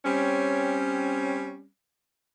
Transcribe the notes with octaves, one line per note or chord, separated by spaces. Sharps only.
G3 C4 C#4